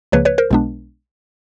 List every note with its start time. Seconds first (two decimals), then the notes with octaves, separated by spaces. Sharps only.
0.12 C#2 C#3 F3 A#3 B4 C#5
0.25 B4 C#5
0.38 A#4 C5
0.51 B1 B2 G#3 B3 D4